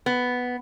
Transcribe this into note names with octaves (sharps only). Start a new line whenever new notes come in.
B3